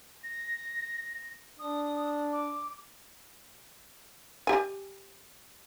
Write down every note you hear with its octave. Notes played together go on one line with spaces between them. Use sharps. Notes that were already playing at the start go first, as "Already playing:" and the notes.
A#6
D4 D#6
D6
G4 G#5